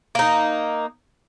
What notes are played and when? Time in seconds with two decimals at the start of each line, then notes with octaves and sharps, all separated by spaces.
0.15 A#3 D#4